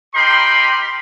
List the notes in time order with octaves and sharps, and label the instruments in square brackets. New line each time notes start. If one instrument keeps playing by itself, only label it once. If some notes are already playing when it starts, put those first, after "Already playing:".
[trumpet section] D#4 G4 A#4 G5 B5 C6